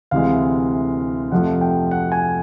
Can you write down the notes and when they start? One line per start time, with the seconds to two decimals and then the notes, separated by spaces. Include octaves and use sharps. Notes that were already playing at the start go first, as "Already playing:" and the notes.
0.11 D2 C3 E3 G#3 F5
1.32 F2 C3 F3 A3 F#5
1.61 G5
1.91 F#5
2.12 G#5